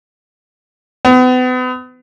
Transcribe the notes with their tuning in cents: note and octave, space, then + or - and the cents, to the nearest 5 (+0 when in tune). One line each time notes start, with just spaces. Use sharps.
B3 +40